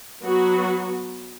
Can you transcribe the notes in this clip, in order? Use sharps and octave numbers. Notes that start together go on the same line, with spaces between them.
F#3 B3 F#4